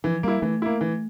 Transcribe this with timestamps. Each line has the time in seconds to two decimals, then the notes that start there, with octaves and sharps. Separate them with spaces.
0.04 E3 F3
0.23 G3 A#3 E4
0.42 E3 A3
0.62 A#3 E4
0.81 E3